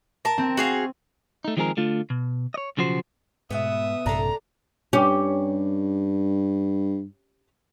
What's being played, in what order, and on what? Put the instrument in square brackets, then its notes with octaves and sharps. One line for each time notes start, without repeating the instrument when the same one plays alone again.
[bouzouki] A#4 A5
[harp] C4
[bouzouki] F#4 G#4 F5
[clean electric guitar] A3 D#4
D#3 F3 G#3 C4 G#4 A#4
D3 A3 F4
B2
C#5 D#5
B1 C#3 F3 F#4 C5
[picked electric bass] G#2 [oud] B2 B3 [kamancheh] E5 D#6
[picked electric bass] A#1 G2 C3 [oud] D4 A4 [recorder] A#5
[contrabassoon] G2 [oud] C#4 G4